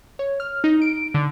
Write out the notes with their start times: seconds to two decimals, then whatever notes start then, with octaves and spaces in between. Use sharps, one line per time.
0.19 C#5
0.40 F6
0.64 D#4
0.82 D7
1.14 D3